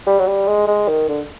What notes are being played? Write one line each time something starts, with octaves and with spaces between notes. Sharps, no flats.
G3
F#3
G3
G#3
G#3
D#3
D3